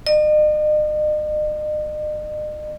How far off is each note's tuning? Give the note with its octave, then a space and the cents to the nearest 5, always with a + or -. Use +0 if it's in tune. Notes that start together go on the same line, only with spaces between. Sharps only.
D#5 -40